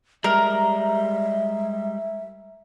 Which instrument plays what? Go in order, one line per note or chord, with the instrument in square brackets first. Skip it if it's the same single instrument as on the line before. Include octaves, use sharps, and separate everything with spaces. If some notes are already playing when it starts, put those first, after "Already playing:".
[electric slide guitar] G3 G#3 [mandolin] A#4 [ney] E5